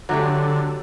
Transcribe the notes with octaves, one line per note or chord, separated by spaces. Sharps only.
D3 F#3 A3 G4